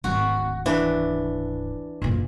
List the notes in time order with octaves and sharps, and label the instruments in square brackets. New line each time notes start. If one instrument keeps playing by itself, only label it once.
[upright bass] D1 G#1 [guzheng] F#4
[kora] E3 [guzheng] D4
[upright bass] F#1 A#2